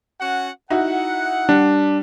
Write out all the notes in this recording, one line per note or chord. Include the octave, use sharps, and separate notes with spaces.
C#4 F#4 F#5
D#4 E4 F#4 F#5
G3 D4